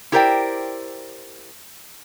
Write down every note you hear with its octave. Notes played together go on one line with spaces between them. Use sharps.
E4 G4 A#4 C5 D5 G5